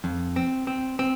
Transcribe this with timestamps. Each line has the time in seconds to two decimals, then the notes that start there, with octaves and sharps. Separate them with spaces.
0.04 F2
0.36 C4
0.67 C4
0.99 C4